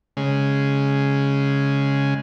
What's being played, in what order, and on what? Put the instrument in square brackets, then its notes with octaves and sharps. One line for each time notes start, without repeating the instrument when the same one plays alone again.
[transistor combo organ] C#3 G#3